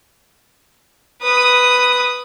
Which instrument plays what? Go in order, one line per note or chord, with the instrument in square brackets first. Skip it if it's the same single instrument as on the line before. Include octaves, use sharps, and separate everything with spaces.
[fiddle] B4 D#6